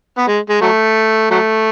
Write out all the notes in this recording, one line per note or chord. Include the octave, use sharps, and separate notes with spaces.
B3
G#3
G#3
F#3 A3
F#3 A3